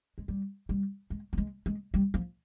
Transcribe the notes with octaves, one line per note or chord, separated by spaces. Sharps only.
G#3
G3
G3
G#3
A#3
G#3
G#3
G3
F3